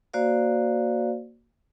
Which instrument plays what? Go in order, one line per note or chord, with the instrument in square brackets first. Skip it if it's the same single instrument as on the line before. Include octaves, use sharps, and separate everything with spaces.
[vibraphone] A#3 F#4 C5 D5 F5